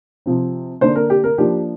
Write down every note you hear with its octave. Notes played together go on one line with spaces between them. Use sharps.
C3 F3 C4
D3 A#3 D4 C5
A#4
G4
A#4
F3 A#3 D4 G4